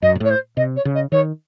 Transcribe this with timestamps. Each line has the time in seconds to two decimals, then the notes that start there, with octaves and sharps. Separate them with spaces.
0.02 F#2 D#5
0.15 A#2
0.20 A2 C#5
0.30 C5
0.57 C3 D#5
0.76 C#5
0.85 C#3
0.94 D#5
1.12 D#3 C#5